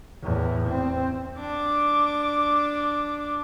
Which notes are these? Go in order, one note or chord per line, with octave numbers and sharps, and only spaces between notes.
E2 A2
C4
D4 D6